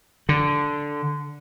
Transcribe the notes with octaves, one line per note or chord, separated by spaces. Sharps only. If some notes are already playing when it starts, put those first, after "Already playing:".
D3